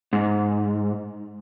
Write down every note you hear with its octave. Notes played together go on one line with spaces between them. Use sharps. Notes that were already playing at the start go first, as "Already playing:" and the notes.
G#2